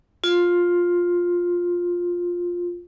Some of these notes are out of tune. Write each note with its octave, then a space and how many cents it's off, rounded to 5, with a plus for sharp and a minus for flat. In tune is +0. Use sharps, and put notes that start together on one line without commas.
F4 +10